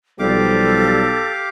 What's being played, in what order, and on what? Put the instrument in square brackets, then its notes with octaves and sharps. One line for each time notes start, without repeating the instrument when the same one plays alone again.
[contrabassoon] B1 [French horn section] F3 G3 [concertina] G4 F5 D6 [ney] A4